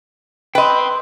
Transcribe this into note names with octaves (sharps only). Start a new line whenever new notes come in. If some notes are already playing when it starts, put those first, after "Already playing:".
B4 D#5 G5 C6